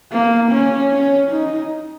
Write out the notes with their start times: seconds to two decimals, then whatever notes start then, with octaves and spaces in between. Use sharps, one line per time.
0.12 A#3
0.51 C#4
0.91 C#4
1.31 D#4